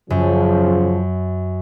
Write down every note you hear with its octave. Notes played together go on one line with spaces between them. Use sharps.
F#2 C#3 F3